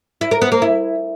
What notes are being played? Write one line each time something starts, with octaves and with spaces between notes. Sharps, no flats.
E4
A#4
B3
A#3
E4